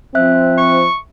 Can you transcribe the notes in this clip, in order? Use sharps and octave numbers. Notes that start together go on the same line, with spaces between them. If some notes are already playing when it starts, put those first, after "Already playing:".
F3 C4 E5 F#6
C#6